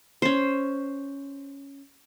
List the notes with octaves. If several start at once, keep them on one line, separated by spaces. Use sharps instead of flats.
C#4 C5